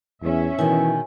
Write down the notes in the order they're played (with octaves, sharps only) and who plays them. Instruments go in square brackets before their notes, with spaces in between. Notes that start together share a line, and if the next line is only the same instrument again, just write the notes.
[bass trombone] E2 [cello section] C#4 E5
[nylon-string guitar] B2 D#3 [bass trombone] E3 [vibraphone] G#5